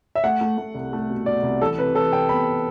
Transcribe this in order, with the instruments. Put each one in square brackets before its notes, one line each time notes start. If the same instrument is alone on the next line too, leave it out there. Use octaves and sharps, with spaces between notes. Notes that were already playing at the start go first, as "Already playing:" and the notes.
[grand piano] E5
A3 F#5
A3
A3
C2
A3
B2
B2 D5
C2
E3 A4
C3 B4
E3 A4
C3 G5
B3 B5